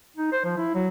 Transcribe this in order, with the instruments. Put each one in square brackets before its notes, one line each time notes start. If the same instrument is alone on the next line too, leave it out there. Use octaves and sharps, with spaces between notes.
[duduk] D#4
C5
F3
E4
F#3